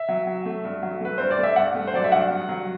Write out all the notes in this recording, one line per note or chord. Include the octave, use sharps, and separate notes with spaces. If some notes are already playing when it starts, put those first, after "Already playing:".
Already playing: E5
F#3
F#3
A3
G2
F#3
A3 B4
G2 C5
D5
A3
E5
G2 F#5
A3
C5
F#3 D5
E5
G2 F#5
G2
F#3